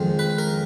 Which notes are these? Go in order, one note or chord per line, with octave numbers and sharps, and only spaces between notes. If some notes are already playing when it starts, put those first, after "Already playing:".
Already playing: F2 D#3 G#3
B4
A#4